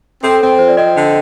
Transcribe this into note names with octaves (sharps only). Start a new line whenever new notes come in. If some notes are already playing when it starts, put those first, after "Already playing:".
C4 A4
C4
F3 C5
D5
C4 D#5
D3